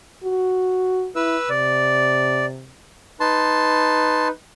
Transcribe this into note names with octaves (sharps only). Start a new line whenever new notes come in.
F#4
E4 B4 E6
C3 D5
D#4 B4 A5 C6